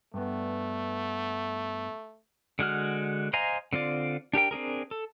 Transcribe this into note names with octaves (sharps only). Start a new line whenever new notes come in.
G2 A3 B3
D3 G#3 F#4 F6
C5 D#5 F5 G#5 A#5
D3 C4 F4 D5
D4 G4 A#4 G5
C4 D4 G#4 A#4
A4